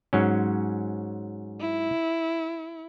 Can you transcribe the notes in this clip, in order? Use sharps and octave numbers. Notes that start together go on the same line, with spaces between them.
G#2 F#3 C#4
E4